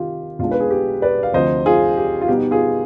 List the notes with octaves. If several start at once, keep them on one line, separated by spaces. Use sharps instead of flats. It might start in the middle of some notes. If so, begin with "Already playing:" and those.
Already playing: C3 D#3 F4 G4
B1 B2 G#3 D4 F4
B4
G#4
G4
B4 D5
F5
D2 C3 F3 C5 D#5
F4 G#4
G4
F4
B2 G3 B3 D#4 G4
F4 G#4